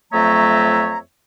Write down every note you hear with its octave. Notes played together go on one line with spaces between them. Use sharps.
F2 F#3 A3 C#5 E5 A#5